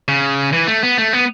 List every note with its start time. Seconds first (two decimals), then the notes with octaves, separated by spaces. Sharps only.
0.08 C#3
0.53 E3
0.67 A3
0.83 B3
0.98 A3
1.13 B3